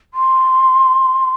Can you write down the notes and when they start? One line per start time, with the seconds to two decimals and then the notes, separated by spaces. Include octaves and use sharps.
0.14 C6